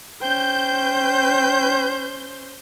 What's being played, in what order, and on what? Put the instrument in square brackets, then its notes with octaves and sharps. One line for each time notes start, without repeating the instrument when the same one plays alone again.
[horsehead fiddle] C#4 C5 [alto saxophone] G5 [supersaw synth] G6